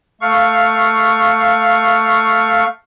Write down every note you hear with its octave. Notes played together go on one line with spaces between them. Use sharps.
A3 F5 C#6